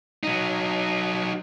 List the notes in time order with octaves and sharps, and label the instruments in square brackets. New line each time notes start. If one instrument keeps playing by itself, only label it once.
[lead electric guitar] F#3 D#4